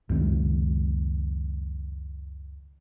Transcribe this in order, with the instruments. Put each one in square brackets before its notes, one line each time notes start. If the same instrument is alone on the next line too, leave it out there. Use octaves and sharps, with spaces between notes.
[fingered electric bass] C#2 F#2 D#3 G#3